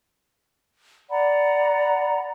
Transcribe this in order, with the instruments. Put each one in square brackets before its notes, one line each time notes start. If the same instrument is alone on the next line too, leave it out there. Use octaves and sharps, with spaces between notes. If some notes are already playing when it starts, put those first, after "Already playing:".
[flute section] D5 F#5 A#5 B5